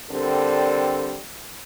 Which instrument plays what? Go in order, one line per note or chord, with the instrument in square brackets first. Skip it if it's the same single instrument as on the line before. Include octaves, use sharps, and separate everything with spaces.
[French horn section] D3 G3 C4 A4 A#4